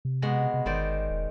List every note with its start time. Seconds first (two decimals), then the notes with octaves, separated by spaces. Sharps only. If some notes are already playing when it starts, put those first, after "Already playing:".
0.05 C3
0.22 B2 G#3 F#5
0.54 C3
0.66 G1 D#3 C5 D5
1.10 E1